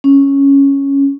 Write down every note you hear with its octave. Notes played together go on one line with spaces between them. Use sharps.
C#4